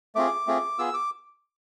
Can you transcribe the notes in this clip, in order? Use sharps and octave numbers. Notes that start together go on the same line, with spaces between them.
A3 C4 F4 G#4 D6
A3 C4 F4 G#4
B3 F4 G#4 E6
D6